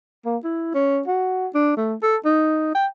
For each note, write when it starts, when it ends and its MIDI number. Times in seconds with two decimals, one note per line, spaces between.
0.25 0.37 58
0.44 0.72 64
0.74 1.01 61
1.08 1.47 66
1.55 1.75 62
1.77 1.94 57
2.03 2.17 69
2.25 2.72 63
2.75 2.87 79